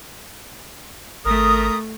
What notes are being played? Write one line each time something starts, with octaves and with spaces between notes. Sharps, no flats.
G#1 A3 A#4 A#5 D#6